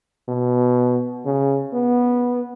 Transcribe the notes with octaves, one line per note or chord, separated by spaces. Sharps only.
B2
C#3
B3